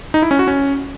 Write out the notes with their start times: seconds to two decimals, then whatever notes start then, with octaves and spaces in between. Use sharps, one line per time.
0.14 D#4
0.22 E4
0.31 C#4
0.39 F#4
0.48 C#4